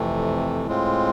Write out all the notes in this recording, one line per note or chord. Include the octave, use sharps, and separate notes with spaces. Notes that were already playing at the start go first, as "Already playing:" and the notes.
Already playing: F2 C3 E3 A3
A2 G#3 C4 F4